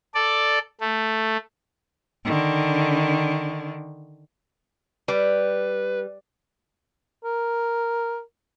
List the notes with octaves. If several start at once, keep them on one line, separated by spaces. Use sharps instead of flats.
A4 D5
A3
D3 D#3
G3 B4
A#4